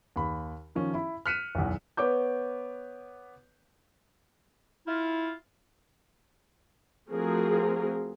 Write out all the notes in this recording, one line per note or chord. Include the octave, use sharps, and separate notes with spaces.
D#2 B5
D#3 F3 C#4
E4 B5
F6 F#6 B6 C#7 D#7 E7
B1 E2
B3 B4 C#5 D6 G6
E4 F4
F3 A3 C4 F#4 G#4 A#4